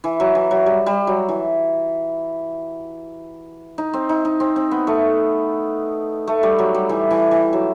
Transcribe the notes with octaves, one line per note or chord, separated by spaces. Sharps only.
E3
F#3
E3
F#3
G3
G3
F#3
E3
D#4
C4
D#4
D#4
C4
C4
B3
A3
A3
G3
F#3
G3
E3
E3
E3
F#3